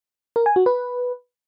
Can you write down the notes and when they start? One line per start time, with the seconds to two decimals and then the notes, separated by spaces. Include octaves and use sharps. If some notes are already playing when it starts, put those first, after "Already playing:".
0.36 A#4
0.46 G#5
0.56 F#4
0.66 B4